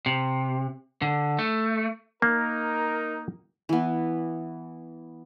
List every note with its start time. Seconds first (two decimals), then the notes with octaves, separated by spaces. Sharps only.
0.06 C3
1.02 D3
1.39 A3
2.22 A#3 D#4 A#4
3.69 E3 B3